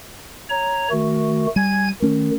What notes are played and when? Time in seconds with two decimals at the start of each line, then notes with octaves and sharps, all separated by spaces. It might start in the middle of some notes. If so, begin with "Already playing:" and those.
0.50 C#5 A#5
0.91 D#3 A3 F#4
1.56 G3 G#5 G#6
2.02 D#3 A3 C#4